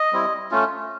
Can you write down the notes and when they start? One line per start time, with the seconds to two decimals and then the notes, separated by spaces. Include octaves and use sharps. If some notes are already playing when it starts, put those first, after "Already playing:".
Already playing: D#5
0.12 G3 C4 E4
0.51 A3 C#4 F4